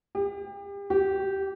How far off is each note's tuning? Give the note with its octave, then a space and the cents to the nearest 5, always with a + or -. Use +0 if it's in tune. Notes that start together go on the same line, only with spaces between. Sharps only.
G4 +35
G4 -15